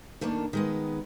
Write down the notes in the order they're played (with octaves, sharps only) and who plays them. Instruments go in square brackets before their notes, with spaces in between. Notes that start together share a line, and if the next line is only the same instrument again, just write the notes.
[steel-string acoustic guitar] D#3 A3 A#3 D4
D#3 G#3 B3